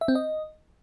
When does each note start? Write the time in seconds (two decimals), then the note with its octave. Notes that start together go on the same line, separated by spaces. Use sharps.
0.01 E5
0.08 C4
0.15 D#5